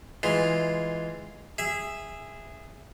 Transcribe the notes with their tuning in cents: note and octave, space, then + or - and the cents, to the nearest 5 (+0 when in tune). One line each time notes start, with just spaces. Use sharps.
E3 +0 G#3 +0 F4 +0
G#4 -15 E5 +0